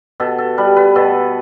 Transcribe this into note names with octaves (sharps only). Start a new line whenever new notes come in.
B2 A4
A4
G3 B4
B4
B2 A4